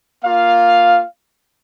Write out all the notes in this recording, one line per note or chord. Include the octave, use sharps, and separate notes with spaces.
A#3 F4 F5